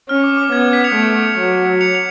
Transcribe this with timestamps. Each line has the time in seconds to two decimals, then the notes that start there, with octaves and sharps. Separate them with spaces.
0.09 C#4 F6
0.24 D6
0.37 D6
0.52 B3 G#6
0.73 B6
0.84 C#7 F7
0.95 A3
1.38 F#3
1.81 C#7 F7
1.95 F7